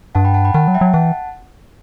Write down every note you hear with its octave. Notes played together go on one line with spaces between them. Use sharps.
G2 F#5 A5
G5 B5
F#5 A5
G5 B5
D#3 F#5 A5
F#3
E5 G5
F#3
E3 F#5 A5